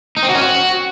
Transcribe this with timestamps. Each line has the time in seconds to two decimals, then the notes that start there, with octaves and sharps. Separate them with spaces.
0.17 D#4
0.23 C4
0.29 F#4
0.35 C#4
0.41 F#4